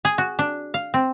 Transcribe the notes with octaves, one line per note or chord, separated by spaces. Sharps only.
G#4
F#4
D4
F5
C4